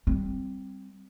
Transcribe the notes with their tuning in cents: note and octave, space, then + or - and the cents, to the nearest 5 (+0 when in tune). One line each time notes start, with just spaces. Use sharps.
G3 -5 C4 +0